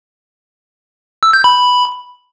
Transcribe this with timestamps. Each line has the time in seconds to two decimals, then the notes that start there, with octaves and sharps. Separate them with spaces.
1.23 E6
1.33 G6
1.44 B5